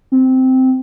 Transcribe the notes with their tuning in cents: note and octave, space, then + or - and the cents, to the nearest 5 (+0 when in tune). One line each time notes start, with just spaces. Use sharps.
C4 -10